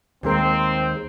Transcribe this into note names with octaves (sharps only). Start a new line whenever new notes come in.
D#2 G#3 C4 A#4